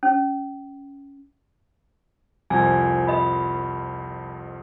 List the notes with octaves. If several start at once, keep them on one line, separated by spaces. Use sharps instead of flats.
C#4
C2 F2 F3 G#5
D#5 B5